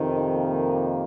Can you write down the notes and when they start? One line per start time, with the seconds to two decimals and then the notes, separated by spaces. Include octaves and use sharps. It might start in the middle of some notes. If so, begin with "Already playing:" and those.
Already playing: F2 C3 D#3
0.34 A#3